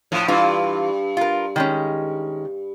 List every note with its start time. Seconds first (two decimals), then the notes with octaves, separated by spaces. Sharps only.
0.12 A2 F3
0.28 G2 E3 F4
1.17 F4 A#4
1.56 D#3 G#3 C#4